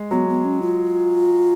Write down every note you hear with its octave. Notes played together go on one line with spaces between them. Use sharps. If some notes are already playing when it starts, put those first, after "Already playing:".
Already playing: G#3
F#3 B3
B3
C#4
F4